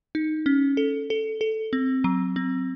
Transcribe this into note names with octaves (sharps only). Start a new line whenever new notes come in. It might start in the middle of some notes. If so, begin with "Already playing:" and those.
D#4
C#4
A4
A4
A4
C4
F#3
C4